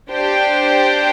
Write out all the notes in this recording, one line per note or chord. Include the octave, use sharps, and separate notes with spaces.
D4 G4 C5 G5